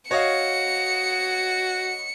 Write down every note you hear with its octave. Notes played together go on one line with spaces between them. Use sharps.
F#4 C#5 D#5 F5 C#7